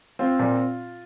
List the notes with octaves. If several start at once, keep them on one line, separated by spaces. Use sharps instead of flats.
C4 F4
A#2